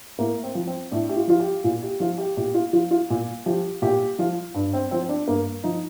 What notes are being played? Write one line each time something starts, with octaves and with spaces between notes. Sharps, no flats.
A2 A#3
C4
F3
C4
A2 D4
G4
F4
F3 F4
G4
A#2 F4
G4
F3 F4
G4
A#2 G4
F4
F3 F4
F4
A#2
F3 G4
A#2 G4
F3 F4
G2 D4
C4
F3 C4
C4
D4
G2 A#3
F3 D#4